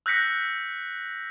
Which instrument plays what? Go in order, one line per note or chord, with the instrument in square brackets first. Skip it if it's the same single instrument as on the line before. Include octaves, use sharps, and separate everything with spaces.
[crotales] E6 F#6 G6 A#6 B6 C#7